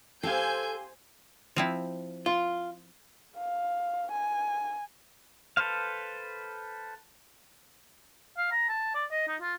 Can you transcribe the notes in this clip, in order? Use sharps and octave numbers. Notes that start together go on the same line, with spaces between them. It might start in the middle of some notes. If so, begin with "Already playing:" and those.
C4 G4 A4 C5 F5 G#5 G6
F3 C4 E4
F4
F5
G#5
A4 B4 C5 F5
F5
A#5
A5
D5
D#5
D#4
F4